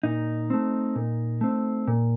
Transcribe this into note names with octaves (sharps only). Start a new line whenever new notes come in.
A#2 D#4
A3 C4
A#2
A3 C4
A#2